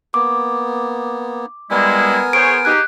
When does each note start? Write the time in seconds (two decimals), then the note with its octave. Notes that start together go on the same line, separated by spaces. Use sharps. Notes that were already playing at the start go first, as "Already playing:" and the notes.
0.14 A#3 B3 D6
1.71 G3 G#3 B3 E4 A#4 G#5
2.33 G#4 C5 C#5 D7
2.65 D#4 G4 G#4 F#6